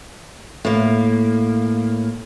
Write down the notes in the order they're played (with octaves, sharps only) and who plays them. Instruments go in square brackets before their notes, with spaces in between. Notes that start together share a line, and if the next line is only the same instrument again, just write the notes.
[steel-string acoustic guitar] A2 A#3